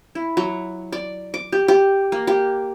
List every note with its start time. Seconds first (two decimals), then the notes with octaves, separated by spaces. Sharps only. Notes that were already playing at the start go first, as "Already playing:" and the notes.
0.15 E4
0.37 F#3
0.92 D5
1.34 D6
1.52 G4
1.68 G4
2.12 A#3
2.27 G4